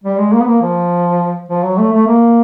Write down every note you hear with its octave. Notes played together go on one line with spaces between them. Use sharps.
G3
G#3
A#3
B3
A#3
F3
F3
F#3
A3
A3
A#3